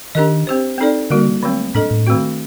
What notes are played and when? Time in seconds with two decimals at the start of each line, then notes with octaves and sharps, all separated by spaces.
0.15 D#3 D4 G4 A#4 D#5
0.47 C4 G4 C5
0.78 C4 D#4 A4 D5
1.10 D3 G3 A#3 F#4 A#4
1.43 D3 F#3 A3 C4
1.75 A2 D4 A4 D#5
1.91 A2
2.07 D#3 A3 C4 F#4